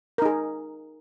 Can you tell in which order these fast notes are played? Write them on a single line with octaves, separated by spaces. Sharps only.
A#4 D#4 G#4